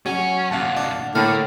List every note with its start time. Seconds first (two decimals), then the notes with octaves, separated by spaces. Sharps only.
0.06 F#3 C#4
0.51 D2 A#2 F5 F#5 A5
0.77 D4
1.15 A2 D3 A#3 F5